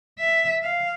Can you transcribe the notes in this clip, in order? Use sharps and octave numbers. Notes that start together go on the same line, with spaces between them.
E5
F5